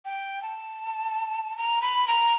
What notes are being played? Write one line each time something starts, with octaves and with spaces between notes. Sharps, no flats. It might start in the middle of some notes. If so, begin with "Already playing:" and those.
G5
A5
A#5
B5
A#5